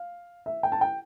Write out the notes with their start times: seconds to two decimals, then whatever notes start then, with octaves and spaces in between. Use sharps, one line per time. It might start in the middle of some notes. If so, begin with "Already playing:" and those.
Already playing: F5
0.46 E5
0.63 G5
0.72 A5
0.81 G5